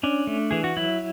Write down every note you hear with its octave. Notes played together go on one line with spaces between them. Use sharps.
C#4 D4
A3
E3 G#4
F#4
F#3 E4